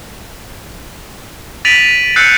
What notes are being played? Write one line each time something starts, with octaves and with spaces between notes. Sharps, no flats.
A6 B6 D7 D#7 F7 F#7
E6 F#6 G6 A6 C7 C#7